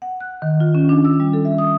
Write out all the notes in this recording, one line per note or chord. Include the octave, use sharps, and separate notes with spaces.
F#5
F#6
D#3
F4
C#4
D4
E6
G3
A4
E5
D#6